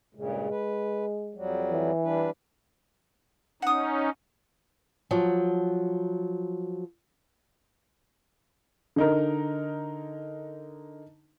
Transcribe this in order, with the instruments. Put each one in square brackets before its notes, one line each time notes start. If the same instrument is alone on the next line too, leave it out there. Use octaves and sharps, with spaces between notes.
[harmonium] G2 A#2 C#3 [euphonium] G#3
[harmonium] B4
F2 F#3 G3
[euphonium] E3
[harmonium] G3 D4 B4
[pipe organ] C#4 D#4 [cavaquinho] F#5 D#6
[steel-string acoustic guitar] F3 F#3
[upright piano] D3 D#4 A#4